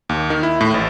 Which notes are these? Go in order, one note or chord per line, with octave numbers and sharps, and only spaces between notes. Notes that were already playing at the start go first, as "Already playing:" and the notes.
D#2
D#3
E4
A2
A1